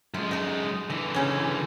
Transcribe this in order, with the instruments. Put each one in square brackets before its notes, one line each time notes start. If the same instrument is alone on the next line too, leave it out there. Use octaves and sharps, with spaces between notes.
[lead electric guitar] F#2 G#3 [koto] F4
[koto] D#4 A5
[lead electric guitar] D3 E3 [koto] D#5
[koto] C#3 C#4 D#4